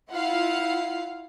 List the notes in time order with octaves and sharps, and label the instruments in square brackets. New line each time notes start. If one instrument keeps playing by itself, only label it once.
[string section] E4 F4 F5 F#5